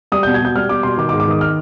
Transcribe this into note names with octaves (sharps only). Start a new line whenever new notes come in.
G3 D#6
B2 G6
G#6
B2 G6
G3 F6
G3 D6
B2 C6
D#3 D6
D6
G#2
D6
D#3 D#6
F6